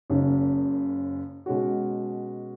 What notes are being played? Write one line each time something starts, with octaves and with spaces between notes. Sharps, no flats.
F#1 F#2 C#3
B2 G#3 C#4 F#4